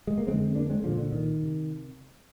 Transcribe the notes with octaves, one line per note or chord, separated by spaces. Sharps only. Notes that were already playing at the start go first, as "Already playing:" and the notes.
G#3
A#3
F2 D3 G#3 C4
A#3 D4
G#3 C4
C2 A#2 D3 F3
D3
D#3
C3